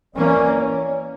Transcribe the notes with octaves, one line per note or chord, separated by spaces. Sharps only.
E3 A#3 C#4 D5
C#5